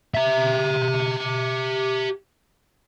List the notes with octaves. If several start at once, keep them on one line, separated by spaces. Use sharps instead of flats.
G4 E5